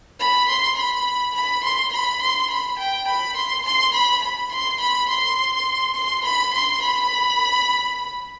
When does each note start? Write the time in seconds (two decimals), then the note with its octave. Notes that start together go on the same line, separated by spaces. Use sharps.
0.20 B5
0.48 C6
0.77 B5
1.35 B5
1.64 C6
1.92 B5
2.21 C6
2.50 B5
2.79 G5
3.07 B5
3.36 C6
3.65 C6
3.94 B5
4.22 B5
4.52 C6
4.80 B5
5.09 C6
5.95 C6
6.24 B5
6.53 C6
6.82 B5